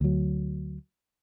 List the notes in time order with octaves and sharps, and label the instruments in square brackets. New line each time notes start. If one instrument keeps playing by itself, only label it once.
[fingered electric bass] D2 F#3